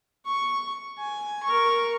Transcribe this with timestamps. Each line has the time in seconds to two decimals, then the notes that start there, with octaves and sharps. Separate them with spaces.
0.25 C#6
0.98 G#5
1.43 A#4 C#6